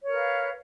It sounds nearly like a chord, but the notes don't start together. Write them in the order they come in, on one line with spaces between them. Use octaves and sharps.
C#5 A#4 B4 F5